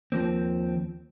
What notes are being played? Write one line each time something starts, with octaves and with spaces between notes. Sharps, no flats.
D#2 F3 A#3 C4